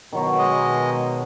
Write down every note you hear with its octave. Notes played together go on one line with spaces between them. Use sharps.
B2 D#3 F#3 C#6
G#3 D#5